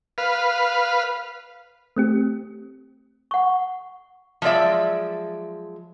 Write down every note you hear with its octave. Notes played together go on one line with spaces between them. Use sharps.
B4 F5
A3 C4 G4
F#5 C#6
F3 F#3 G#3 D5 E5